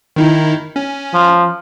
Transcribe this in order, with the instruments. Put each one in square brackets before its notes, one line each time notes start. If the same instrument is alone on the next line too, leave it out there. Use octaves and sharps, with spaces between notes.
[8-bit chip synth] D#3 D#4 E4
C#4
[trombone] F3